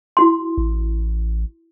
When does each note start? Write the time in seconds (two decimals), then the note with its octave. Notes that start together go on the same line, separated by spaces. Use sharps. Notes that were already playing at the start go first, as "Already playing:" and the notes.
0.17 E4 F#4 C6
0.58 A1